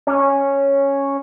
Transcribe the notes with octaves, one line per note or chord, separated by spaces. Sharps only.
C#4